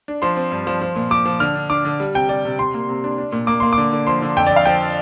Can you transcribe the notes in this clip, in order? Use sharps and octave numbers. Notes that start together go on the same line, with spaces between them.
D4
F3 C6
C4
G2
F3
F3
A#2
F3 D6
F3
D3 F6
D4
D4 D6
D3
G3
C3 G5
G3 D5
C3
C3 C6
A#3
C3
D4
D4
A#2
A#3 D6
A#3 C6
D6
D3
D3
F3 C6
D3
F2 G5
D5
F2
F5
F3 G5